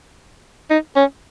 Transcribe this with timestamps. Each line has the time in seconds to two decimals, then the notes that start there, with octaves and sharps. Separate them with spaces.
0.70 D#4
0.96 C#4